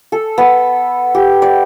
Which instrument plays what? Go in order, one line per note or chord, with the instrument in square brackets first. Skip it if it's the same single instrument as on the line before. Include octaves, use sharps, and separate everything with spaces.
[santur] A4
B3
G4
D5